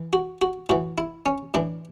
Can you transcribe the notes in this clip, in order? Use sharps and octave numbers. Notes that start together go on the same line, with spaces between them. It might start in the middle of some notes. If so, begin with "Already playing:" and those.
Already playing: E3
F#4
F#4
A2 E3 F#4
E4
C#4
A2 E3 D4